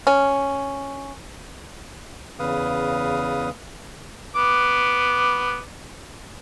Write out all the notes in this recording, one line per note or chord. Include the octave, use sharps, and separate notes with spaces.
C#4
E2 C#3 B4 F5 D#6
B3 D6